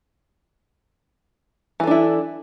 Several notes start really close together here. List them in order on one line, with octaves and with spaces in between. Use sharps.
E3 A4 D4 E4